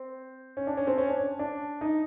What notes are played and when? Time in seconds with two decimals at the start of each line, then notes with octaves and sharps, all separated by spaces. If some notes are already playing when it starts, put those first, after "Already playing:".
Already playing: C4
0.57 C#4
0.67 D4
0.77 C#4
0.87 C4
0.98 C#4
1.08 D4
1.19 C#4
1.39 D4
1.81 D#4